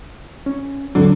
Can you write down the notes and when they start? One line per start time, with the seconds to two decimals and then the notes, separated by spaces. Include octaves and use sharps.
0.46 C#4
0.95 E2 G#2 D3 F#3